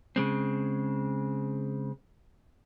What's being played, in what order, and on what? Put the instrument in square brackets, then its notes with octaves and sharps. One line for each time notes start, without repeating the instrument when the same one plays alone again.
[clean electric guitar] C#3 G#3 C4